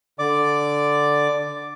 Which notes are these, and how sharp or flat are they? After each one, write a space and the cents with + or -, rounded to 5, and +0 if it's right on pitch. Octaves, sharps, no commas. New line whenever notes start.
D3 -5 D5 +0 D6 +0